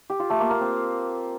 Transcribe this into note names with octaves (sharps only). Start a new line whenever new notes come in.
G4
F4
A3
A#3
A#3
C4